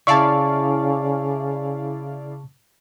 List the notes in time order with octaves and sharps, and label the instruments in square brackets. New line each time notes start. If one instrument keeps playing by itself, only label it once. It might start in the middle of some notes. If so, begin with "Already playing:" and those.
[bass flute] C#3 [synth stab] E4 D5 F5 [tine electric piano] A5 C#6